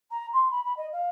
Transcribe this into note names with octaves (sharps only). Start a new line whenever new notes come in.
A#5
C6
B5
B5
D#5
F5